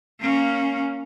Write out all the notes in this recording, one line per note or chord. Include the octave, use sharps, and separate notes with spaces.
A#3 C#4